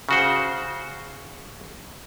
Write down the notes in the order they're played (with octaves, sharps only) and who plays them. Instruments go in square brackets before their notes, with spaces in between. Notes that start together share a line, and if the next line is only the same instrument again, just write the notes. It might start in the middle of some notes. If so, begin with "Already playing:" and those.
[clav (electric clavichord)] C#3 F#4 C5